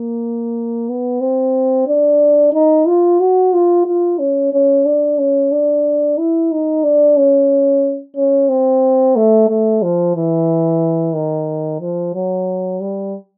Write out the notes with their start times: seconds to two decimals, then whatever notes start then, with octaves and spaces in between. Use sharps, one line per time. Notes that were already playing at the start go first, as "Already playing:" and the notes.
Already playing: A#3
0.89 B3
1.21 C4
1.88 D4
2.53 D#4
2.87 F4
3.20 F#4
3.53 F4
3.86 F4
4.19 C#4
4.53 C#4
4.85 D4
5.19 C#4
5.52 D4
6.18 E4
6.52 D#4
6.84 D4
7.17 C#4
8.17 C#4
8.49 C4
9.16 A3
9.49 A3
9.83 F3
10.16 E3
11.15 D#3
11.80 F3
12.14 F#3
12.80 G3